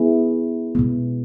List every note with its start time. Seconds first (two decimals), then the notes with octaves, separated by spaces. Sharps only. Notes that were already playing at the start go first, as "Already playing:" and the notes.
Already playing: B3 E4 G#4
0.75 B2 G#3 B3